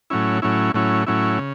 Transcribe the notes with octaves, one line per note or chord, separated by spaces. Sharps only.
A2 F#3 C#4 E4
A2 F#3 C#4 E4
A2 F#3 C#4 E4
A2 F#3 C#4 E4
C#3